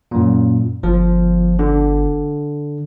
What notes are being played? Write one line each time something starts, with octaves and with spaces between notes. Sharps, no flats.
F#2 A#2
G1 F3
D3